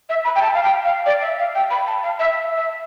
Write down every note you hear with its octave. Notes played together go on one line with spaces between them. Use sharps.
E5
B5
G5
A5
F5
G5
F5
D5
E5
F5
G5
B5
A5
F5
E5
E5